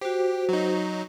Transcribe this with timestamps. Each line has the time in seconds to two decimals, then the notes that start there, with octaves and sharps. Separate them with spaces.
0.01 F#4 G4 C5
0.49 F#3 D#4